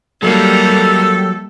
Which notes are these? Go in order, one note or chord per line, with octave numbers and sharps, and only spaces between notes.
D#3 F#3 G3 A3 A#3 G4 A4